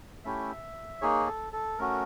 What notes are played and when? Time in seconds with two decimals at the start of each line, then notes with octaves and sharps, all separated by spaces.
0.25 A3 C#4 E4 G4 E5
1.01 A#3 D#4 G#4 C#5
1.27 A4
1.53 A4
1.78 A3 C#4 F#4 A#4